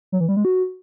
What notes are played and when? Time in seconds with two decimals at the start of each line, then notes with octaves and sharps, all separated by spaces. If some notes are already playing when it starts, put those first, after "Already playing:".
0.12 F#3
0.20 E3
0.29 G3
0.37 G#3
0.45 F#4